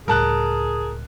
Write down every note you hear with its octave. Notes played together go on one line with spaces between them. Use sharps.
C#2 A2 G3 G#4 A#4 A5 F#6